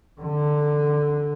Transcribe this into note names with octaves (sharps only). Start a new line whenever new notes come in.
D3